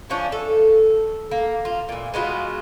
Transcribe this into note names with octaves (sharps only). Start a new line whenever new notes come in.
E3 F3 C#4 D4
A4
A#3
F4
A#2 E3
G#3 B3 F4 F#4